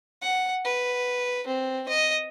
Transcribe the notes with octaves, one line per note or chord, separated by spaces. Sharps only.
F#5
B4
C4
D#5